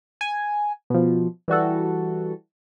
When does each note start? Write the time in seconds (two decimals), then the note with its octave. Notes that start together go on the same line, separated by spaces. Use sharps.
0.21 G#5
0.90 B2 F3
1.48 E3 G3 F#4 A4